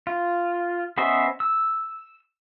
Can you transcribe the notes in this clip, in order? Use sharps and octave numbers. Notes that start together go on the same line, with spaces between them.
F4
B3 C#4 C5 D#5 E5
E6